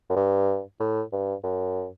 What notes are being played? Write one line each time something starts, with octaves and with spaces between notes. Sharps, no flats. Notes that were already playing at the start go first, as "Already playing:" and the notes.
F#2
G2
A2
G2
F#2